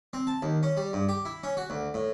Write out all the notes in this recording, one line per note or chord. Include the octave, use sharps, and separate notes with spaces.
C4
A5
D#2
C#4
G3
G2
G4
E4
C#4
F#4
D2
A2